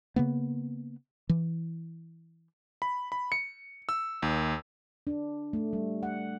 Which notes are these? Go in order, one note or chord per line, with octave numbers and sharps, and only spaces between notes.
C#3 A#3 B3
E3
B5
B5
C#7
E6
D#2
D4
A3
G3
F#5